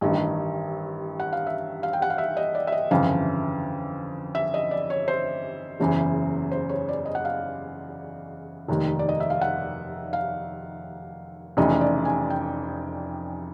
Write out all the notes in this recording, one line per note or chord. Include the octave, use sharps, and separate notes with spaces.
A1 G2 D#3 D#5
F#5
F5
E5
F5
G5
F#5
F5
E5
D#5
D5
E5
D#5
G1 F2 C#3 E3 F5
E5
D#5
D5
C#5
C5
F#1 E2 C#3 E3
C5
C#5
D5
D#5
F#5
F5
F1 D#2 D#3
D5
D#5
E5
F5
F#5
F5
F1 F2 C#3 E3 D#5
D5
G#5
G5